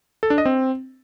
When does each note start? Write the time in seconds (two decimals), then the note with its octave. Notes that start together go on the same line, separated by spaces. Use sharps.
0.23 A4
0.30 D4
0.38 D#5
0.45 C4